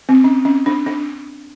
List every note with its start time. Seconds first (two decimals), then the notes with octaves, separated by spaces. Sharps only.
0.09 C4
0.24 C#4
0.45 C#4
0.66 D4
0.86 D4